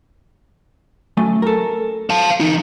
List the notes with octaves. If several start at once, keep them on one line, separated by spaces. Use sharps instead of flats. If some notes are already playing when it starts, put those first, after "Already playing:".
F#2 A3 G#5
A4 A#4
F5 A5
E3 D#4